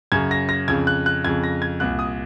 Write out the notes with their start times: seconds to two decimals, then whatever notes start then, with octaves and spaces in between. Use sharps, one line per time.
0.12 F#2 C#3 G#6
0.31 A#6
0.49 A#6
0.68 F2 C#3 G#6
0.87 F#6
1.06 F#6
1.24 F2 C#3 G#6
1.44 A#6
1.62 G#6
1.80 C2 A#2 F#6
1.99 D#6